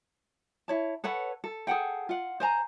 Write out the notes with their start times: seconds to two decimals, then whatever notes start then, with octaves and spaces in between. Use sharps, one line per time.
0.68 E4 C#5 A5
1.04 A4 B4 C#5 F#5
1.44 A4
1.67 G#4 A4 F#5 G5
2.09 F4 F#5
2.40 C5 G#5 A#5